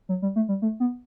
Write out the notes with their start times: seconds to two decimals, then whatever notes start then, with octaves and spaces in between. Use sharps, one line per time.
0.09 F#3
0.22 G3
0.36 A3
0.49 G3
0.62 A3
0.80 B3